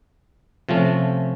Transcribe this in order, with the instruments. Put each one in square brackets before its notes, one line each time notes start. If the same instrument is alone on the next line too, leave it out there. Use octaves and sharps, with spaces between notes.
[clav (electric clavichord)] C3 F3 A3 C#4